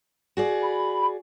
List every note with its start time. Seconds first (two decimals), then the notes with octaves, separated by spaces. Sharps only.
0.37 F#4 G#4 D5
0.63 B5